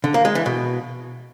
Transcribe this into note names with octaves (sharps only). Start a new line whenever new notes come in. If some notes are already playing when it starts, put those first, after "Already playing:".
D3
A#3
G#3
E3
B2